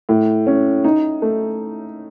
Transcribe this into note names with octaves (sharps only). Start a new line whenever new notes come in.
A2
C#4
D#4
A3